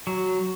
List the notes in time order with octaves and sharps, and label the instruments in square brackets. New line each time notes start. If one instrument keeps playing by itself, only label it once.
[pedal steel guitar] F#3